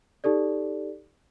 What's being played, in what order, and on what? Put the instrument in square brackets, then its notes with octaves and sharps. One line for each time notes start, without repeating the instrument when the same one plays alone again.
[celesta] D#4 G4 A4 D5